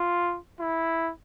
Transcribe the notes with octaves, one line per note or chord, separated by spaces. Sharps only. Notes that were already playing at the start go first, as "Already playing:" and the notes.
Already playing: F4
E4